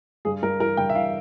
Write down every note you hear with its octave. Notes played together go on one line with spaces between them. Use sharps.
G2 G#4
G2 A#4
E3 A#4
G2 G5
E5
E3 F5